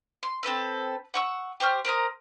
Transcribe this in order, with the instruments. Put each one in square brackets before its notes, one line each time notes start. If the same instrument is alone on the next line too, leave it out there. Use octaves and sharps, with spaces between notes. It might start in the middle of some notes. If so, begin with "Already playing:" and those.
[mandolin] C6
C4 A4 B4 E6
F#5 C#6 E6
G4 C5 C#6 F6
A#4 C5 A#5 D#6